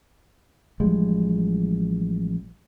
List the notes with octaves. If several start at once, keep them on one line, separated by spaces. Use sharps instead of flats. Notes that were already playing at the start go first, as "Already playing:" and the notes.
A1 F3 G3 G#3